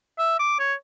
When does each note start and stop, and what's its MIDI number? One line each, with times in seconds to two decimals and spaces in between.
0.18 0.35 76
0.39 0.58 86
0.59 0.74 73